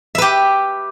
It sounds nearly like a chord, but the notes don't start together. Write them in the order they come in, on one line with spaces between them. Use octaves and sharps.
E5 B4 G4